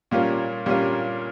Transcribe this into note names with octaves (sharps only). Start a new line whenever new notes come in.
A#2 G3 A#3 C#4 F4
A#2 G3 A#3 C#4 F4